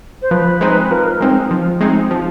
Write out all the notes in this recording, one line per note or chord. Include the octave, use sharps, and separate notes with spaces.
C5
F3 B4
G#3 C4 D#4
F3 A#4
G#3 C4 D#4
F3
G#3 C4 D#4
F3